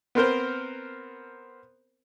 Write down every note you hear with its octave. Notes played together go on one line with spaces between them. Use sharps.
B3 C4 A#4 C5